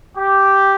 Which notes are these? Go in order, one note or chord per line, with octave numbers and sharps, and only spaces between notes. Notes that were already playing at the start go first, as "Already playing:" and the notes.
G4